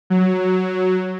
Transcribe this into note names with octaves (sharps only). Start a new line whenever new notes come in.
F#3